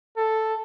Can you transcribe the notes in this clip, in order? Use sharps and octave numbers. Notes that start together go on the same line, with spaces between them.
A4